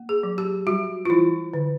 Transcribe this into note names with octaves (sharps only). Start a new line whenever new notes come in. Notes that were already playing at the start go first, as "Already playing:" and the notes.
Already playing: A#3
G#4
F#3
G4
G3 F#4
F4
E3 E4
D3